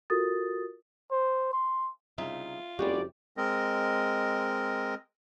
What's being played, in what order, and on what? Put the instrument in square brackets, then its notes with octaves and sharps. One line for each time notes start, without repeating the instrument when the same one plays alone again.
[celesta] F4 F#4 A4 A#4 D#6 A6
[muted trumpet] C5
C6
[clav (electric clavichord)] C2 C#3 D#4 [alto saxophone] F4 [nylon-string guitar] E5
[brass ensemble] F#1 F2 D5 [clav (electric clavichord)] G3 G#3 F#4 [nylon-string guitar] G4
[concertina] G#3 C4 A#4 D#5